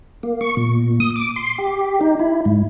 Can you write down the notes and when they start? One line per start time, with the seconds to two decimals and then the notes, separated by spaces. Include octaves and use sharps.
0.23 A#3
0.41 C#6
0.57 A#2
1.00 D#6
1.16 D6
1.36 C6
1.58 G4
2.01 D#4
2.20 E4
2.45 G#2